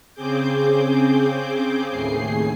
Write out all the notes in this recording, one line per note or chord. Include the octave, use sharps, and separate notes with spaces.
C#3 C4 G#4 D6 G6
D#2 A2 G#4 C7